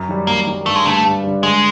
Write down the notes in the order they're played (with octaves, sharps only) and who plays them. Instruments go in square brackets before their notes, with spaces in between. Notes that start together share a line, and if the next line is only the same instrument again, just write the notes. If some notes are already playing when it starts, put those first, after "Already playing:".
Already playing: [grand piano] F#2
D#3 G3
[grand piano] F#2 [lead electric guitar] A#3
[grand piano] D#3 G3
[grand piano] G2 [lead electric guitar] A3
[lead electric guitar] G#3
[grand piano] D3 G3 [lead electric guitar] A3
[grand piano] G2
D3 G3
[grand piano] D3 [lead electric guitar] G#3